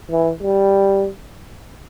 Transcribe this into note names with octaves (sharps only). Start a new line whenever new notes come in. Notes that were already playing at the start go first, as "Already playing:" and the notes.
E3
G3